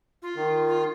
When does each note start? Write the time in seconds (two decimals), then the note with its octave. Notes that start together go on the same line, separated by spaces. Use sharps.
0.22 F4
0.36 D#3
0.67 F4